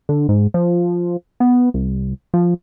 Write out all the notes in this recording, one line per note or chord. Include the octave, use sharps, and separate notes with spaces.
D3
G#2
F3
B3
C2
F3